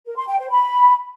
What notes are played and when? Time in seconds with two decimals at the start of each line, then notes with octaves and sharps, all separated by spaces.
0.06 A#4
0.17 C6
0.28 G5
0.39 C5
0.50 B5